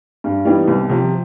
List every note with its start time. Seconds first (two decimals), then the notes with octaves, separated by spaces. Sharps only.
0.24 G2
0.45 E3 G3 B3 D#4
0.67 C2
0.89 C3 F3